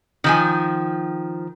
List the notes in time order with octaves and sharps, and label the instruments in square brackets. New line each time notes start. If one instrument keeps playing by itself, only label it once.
[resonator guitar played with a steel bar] D#3 F3 G#5